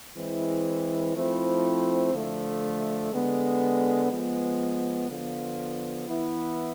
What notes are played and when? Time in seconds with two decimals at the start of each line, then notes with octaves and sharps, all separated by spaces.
0.16 E3 G#3 C4 E4
1.15 F3 A3 C4 E4
2.13 D3 F3 A3
3.11 D3 G#3 B3
4.11 F3 G#3 B3
5.09 D3 F3 B3 F4
6.08 E3 B3 E4